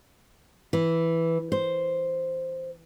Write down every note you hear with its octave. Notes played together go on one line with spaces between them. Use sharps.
E3
C5